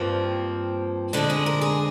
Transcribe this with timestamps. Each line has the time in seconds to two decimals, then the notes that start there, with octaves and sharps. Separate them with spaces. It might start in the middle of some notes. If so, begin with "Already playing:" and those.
Already playing: G2 F3 A#3 C4
1.13 F2 D3 G#3 D4
1.30 G#4
1.46 A#4
1.61 G#4